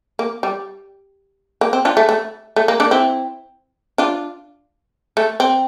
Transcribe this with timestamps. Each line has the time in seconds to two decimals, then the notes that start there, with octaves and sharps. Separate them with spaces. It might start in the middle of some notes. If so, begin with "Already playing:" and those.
0.19 A#3
0.43 G3
1.61 A#3
1.73 C4
1.85 D4 F4
1.97 A3
2.09 A3
2.56 A3
2.68 A#3
2.80 A#3 D4
2.91 C4 E4
3.98 D4 F4
5.17 A3
5.40 C4